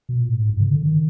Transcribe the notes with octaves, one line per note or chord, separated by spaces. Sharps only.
B2
A#2
A2
G#2
G2
C#3
D3
D#3